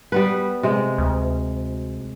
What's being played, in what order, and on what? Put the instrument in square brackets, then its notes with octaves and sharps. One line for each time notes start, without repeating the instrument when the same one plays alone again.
[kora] G3 B3 B4
C3 G#3
[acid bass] D2